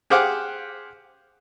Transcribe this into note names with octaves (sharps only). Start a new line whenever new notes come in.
G4 G#4 C5 F5 F#5 D6